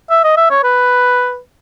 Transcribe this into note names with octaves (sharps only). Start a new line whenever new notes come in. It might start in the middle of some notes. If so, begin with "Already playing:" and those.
E5
D#5
E5
C#5
B4